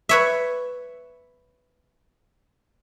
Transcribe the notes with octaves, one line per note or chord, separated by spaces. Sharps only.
B4 C#5 E5